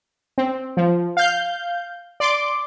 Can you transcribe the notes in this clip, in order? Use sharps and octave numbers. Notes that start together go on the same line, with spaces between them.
C4
F3
F5 G6
D5 C6 D6